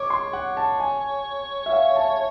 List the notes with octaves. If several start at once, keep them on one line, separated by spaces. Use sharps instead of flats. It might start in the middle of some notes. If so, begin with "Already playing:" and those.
Already playing: C#5 D6
C6
F#5
A5
G#5
E5
F5
A5